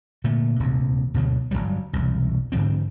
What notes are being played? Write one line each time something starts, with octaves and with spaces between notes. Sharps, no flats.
A#2 D3 A3
D#1 D2 C3
D2 B2 D3 F#3
G1 F#2 F#3 G3
E1 C2
G#2 D3 F3 C4